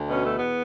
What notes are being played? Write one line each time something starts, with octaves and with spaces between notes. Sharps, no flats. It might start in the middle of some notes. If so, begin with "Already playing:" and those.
Already playing: D2
B2 C#4
A3
E2
B3